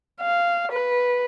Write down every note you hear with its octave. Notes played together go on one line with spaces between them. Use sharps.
F5
B4